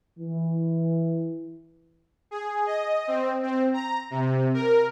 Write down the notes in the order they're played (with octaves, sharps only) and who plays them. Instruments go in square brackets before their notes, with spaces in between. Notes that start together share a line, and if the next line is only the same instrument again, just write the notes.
[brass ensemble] E3
[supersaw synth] G#4
D#5
C4
C4
A#5
C3
A#4